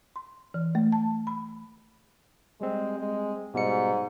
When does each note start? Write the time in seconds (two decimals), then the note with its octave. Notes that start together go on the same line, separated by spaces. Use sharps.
0.16 C6
0.54 E3
0.75 A3
0.92 A5
1.27 B5
2.61 G3 G#3 C4
2.99 G#3
3.54 G#2 B2 G3 C#7